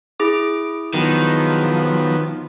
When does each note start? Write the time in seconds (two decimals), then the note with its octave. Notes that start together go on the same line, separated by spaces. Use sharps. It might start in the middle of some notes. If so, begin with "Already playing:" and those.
0.20 E4 G#4 D6
0.94 D#3 F3 F#3 B3